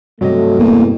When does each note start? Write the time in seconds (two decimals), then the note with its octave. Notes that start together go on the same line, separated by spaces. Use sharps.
0.21 G2 C3 F#3 A3 D#5
0.59 E2 A#3